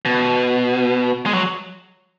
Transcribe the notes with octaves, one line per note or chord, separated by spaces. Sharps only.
B2
G#3
F#3